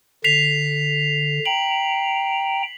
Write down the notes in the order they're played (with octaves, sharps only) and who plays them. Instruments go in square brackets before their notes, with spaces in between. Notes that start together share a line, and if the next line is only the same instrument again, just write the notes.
[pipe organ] D3 [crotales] B6 C7 F7
[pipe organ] G5 A#5 [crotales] F#7